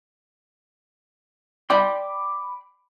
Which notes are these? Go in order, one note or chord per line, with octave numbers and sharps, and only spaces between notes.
D5 G5 B5 C6 D6